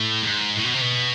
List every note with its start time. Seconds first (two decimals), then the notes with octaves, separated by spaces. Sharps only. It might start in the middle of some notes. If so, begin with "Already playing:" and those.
Already playing: A2
0.23 G#2
0.56 A2
0.64 B2
0.73 C3
0.81 B2